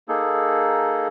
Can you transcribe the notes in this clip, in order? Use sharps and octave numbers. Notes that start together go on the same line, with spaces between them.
A#3 D#4 G#4 A4